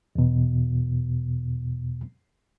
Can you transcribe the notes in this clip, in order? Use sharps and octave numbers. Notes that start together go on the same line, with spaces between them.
E2 B2